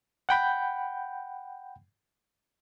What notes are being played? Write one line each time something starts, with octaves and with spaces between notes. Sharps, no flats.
F#5 G5 B5 G6